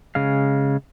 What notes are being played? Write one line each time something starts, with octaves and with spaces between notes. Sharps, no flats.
C#3 G#3 F5